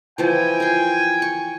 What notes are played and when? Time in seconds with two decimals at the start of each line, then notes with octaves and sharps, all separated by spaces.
0.18 E3 F3 E4 G5 G#5
0.60 A#4 C6
1.22 C#6